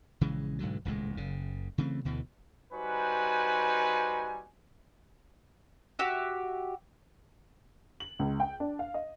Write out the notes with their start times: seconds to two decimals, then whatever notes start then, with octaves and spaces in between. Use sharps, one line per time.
0.21 A#1 C#3 E3 G#3
0.59 B1 G#2 D3 F#3
0.85 D#1 C#2 A2 G#3
1.17 F#1 C#3
1.78 C#3 E3 A3 C4
2.05 D2 B2 D3 E3
2.73 G3 D#4 F#4 B4 C5 G#5
5.99 F#4 G4 E5
8.00 F#7
8.19 C#2
8.40 G5
8.60 D4
8.79 F5
8.94 D#5